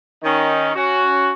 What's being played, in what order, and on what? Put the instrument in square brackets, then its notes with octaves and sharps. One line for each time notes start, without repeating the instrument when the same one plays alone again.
[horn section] D#3 C#4 D#4
C#4 F#4